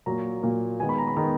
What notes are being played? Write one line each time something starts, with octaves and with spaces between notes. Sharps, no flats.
A#2 F#3 A#3 A#5
A#2 F#3 A#3
D#3 G#3 B3 G#5
B5
A#5
B5
D#3 G#3 B3 A#5